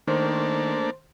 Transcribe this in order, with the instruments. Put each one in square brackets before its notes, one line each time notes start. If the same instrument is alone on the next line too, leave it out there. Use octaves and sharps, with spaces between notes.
[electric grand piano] D#3 [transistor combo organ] A3 A#3 D4 [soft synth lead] C5